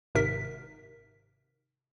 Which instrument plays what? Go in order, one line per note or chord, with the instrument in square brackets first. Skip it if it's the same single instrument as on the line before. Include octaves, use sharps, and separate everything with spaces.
[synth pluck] G#1 G#2 C3 A#4 B6